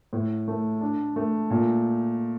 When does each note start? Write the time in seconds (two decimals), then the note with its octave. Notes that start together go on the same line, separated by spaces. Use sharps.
0.13 A2
0.48 A3
0.81 D4
1.16 A3
1.50 A#2